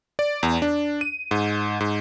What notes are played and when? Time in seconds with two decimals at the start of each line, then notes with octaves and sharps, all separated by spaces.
0.19 D5
0.43 E2
0.62 D4
1.01 D#7
1.31 G#2
1.80 G#2